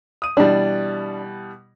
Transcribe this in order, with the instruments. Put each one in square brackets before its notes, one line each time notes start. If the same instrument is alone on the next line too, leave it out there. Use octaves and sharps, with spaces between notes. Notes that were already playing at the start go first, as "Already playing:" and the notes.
[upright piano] D#6 D#7
[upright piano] B2 E3 G3 [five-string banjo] D4